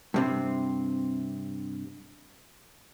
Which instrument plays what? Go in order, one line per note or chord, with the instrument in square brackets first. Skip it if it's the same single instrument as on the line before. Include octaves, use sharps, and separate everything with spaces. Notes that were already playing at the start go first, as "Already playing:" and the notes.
[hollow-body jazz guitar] G2 C3 C4